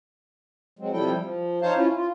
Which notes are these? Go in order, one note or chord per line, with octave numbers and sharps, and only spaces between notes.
F#3 G#3 C4
C3 F3 G3 E4 A4 G5
F3
D#4 C5 C#5 F5 A5
C#4 E4 F4
F4